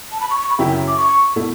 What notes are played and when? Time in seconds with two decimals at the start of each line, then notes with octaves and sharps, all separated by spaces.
0.12 A5
0.21 B5
0.31 C#6
0.41 C#6
0.50 B5
0.59 F#2 C#3 F#3 C#4 E4 G5
0.69 G5
0.88 D6
0.97 C#6
1.36 B2 A3 E4